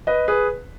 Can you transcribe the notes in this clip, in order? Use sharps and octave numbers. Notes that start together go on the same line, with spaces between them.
B4 D#5
G#4 B4